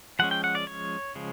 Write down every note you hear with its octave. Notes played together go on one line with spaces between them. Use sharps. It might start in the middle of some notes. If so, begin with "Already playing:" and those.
F3 G#3 C#4 F#5
G5
F#5
D5
C#5
C#3 F3 G#3